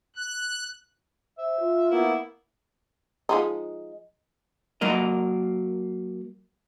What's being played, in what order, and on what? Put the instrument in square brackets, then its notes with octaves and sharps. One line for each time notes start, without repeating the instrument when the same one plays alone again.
[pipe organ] F#6
[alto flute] C5 [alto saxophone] E5
[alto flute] F4
[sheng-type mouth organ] A#3 B3 [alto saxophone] E4
[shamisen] F3 G#3 D#4
[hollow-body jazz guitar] F#3 A#3 A#4 D#5